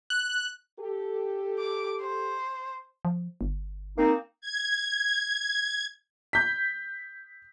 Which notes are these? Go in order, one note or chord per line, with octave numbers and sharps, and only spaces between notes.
F#6
G4 A4
D6
C5
F3
G1
A#3 C4 D#4
G#6
G6 B6